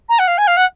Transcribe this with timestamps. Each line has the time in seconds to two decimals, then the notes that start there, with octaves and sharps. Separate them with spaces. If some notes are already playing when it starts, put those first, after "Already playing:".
0.09 A#5
0.19 F#5
0.27 F5
0.37 G#5
0.47 F5
0.56 F#5